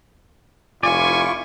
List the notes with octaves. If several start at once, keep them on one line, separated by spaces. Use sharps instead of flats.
F1 E4 F4 D5 G#5 C#6